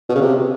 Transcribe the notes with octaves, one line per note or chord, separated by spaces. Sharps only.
B2
C#3
C3